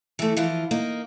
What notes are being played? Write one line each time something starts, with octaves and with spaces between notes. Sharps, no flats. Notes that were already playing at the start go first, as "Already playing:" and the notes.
E3 A3
E3 F3 F4
A#3 D#4